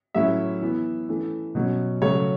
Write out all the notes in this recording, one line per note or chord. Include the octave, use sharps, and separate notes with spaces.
A2 F#3 C#4 E4 E5
E3 B3 E4
E3 A3 C#4
B2 F#3 C#4
C#3 F#3 A3 C#4 C#5